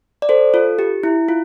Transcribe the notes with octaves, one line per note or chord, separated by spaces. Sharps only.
D5
A4 C5
F4 A4
G4
E4
F4